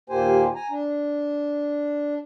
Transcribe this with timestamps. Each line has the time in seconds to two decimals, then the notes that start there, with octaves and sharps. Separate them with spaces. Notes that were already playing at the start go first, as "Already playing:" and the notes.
0.10 D#2 A#2 A#3 G4 C5 G#5
0.55 G#5 A#5
0.70 D4